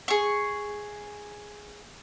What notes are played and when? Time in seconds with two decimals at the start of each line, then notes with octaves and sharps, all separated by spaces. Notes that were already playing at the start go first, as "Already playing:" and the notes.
0.08 G#4 C#6